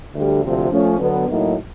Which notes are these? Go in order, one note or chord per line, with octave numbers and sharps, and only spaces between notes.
D2 D3 G3
D2 C3 F3
F3 A3 C#4
D3 F#3 B3
A2 F#3 A#3 D#4